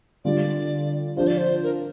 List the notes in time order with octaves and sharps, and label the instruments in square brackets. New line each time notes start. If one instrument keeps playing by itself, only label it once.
[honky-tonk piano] D3 G3 D4 F4 [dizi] D5
[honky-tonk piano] F3 D4 F4 [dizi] C5
[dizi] D5
C5
A#4